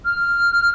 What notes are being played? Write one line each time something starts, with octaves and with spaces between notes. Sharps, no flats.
F6